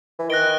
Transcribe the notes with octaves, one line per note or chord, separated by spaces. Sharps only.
E3
D#3 F#6 A#6 D7 G7